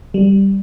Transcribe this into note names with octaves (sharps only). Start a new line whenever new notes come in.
G3